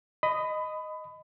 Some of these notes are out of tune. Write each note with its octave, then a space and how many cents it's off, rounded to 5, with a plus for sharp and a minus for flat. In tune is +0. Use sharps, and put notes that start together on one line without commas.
D#5 +0 B5 +25